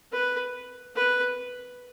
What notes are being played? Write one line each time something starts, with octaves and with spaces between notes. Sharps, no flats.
B4
B4